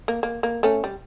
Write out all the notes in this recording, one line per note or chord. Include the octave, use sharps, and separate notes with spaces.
A#3
A#3
A#3
A3 C#4
G3